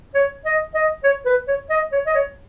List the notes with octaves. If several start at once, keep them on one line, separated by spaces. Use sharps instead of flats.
C#5
D#5
D#5
C#5
B4
C#5
D#5
C#5
D#5
C#5